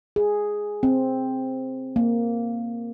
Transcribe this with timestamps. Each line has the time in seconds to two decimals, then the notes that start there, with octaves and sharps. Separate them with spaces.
0.16 G#4
0.83 C4
1.96 A#3